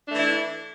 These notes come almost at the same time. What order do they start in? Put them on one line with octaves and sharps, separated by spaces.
D4 A3 E3 E4